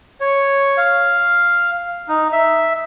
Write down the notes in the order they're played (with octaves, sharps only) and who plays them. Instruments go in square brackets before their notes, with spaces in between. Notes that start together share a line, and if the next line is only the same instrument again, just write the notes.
[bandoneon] C#5
F5
D#4
E5